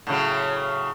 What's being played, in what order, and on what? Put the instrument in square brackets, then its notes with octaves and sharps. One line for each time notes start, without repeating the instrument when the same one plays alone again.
[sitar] A2 C#3 F#3